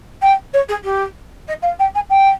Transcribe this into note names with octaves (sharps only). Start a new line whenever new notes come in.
G5
C#5
G#4
G4
D#5
F5
G5
G#5
G5